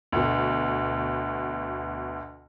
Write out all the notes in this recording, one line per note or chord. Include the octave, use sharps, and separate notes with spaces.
D2 B2